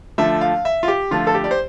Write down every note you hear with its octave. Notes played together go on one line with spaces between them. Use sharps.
D3 F3 A3 E5
F5
E5
F4
G4
D3 F3 A3 F4
A4
G4
D5
C5